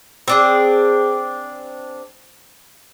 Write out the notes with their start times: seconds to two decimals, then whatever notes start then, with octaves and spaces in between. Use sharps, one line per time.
0.28 C4 D4 G#4